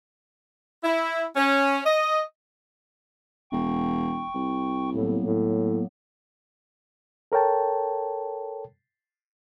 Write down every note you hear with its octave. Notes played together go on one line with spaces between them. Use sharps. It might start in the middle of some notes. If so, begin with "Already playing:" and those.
E4
C#4
D#5
E1 G5 C#6
C2
A2 F#3 A#3 B3
A2
A4 A#4 C#5 G5 A5